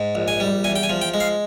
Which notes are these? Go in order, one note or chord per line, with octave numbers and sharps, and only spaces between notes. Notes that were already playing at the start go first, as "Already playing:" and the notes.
Already playing: G#2
A#1
G#5
G3
E2 G#5
G5
G#5
F3
G5
G#3
F5